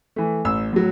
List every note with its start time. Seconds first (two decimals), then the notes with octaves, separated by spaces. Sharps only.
0.16 E3 A3
0.45 A1 E6
0.73 A2 F#3